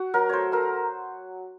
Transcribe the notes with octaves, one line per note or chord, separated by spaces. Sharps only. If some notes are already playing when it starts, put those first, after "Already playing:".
Already playing: F#4
F#3 A#4
A3 C5 C#5
A3 A#4